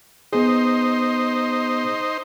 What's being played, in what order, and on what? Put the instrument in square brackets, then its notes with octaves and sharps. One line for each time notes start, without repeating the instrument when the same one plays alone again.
[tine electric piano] B3 G#4 [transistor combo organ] D#4 C5